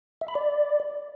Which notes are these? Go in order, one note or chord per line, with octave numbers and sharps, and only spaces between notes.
E5
B5
D5